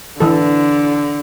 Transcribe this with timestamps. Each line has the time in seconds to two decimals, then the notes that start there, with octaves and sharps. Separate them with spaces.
0.20 D3 E3 A4